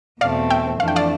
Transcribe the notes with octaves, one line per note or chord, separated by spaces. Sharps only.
E2 B2 A3 C4 D5 F5
E5 G5
F2 E3 A3 D4 F5
G5
D5 F5